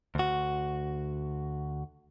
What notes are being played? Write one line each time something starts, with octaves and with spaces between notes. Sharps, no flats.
D2 F#4